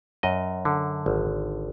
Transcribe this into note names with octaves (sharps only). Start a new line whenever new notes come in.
F#2 D#5
D3
G#1